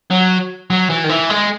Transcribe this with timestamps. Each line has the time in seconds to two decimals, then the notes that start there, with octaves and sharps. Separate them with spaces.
0.11 F#3
0.70 F#3
0.90 E3
1.04 D#3
1.09 E3
1.30 G#3